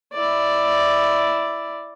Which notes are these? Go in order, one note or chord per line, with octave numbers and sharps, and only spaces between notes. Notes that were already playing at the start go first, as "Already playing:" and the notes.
E4 D5